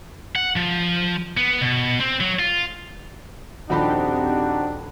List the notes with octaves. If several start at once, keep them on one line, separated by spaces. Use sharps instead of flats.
F#5
F3
B3
B2
C4
F#3
F4
D#1 F3 C4 D4 D#4 F#4 G4 B5